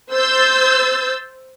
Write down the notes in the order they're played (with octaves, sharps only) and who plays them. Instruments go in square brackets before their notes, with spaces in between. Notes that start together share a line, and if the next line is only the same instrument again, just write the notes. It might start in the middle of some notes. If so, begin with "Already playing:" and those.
[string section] C5 E6 G6 A6